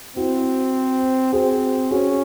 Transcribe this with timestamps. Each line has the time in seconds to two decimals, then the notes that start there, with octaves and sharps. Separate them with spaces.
0.16 C4 E4 F#4
1.33 C4 F#4 G#4
1.91 C#4 F#4 G#4